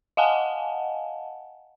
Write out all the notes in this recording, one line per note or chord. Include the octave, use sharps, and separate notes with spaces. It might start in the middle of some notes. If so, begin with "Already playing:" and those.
D#5 F5 F#5 G#5 A5